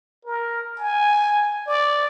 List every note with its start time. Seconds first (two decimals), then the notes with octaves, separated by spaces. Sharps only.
0.25 A#4
0.78 G#5
1.67 D5